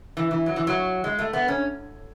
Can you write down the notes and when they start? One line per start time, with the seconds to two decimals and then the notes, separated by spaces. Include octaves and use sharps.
0.17 E3
0.31 E3
0.46 F#3
0.56 E3
0.67 F#3
1.04 G#3
1.19 A3
1.33 B3
1.48 C#4